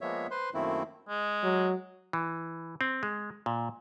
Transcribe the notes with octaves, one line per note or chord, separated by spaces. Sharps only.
F3 G#3 A#3 B3 C#5 E5
B4 C5 C6
F#2 D#3 A3 A#3 C4 E4
G#3
F#3
E3
C4
G#3
A#2